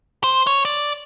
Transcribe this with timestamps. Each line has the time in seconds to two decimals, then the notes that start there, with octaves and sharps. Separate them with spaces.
0.24 C5
0.47 C#5
0.65 D5